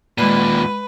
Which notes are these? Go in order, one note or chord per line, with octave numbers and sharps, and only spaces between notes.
D#2 A#2 G#3 B4 D#7